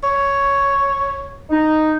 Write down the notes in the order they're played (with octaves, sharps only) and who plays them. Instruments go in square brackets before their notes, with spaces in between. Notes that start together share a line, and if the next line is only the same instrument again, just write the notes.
[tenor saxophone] C#5
[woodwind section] D#4